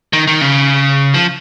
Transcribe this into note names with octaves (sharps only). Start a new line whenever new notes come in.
D#3
D#3
C#3
F3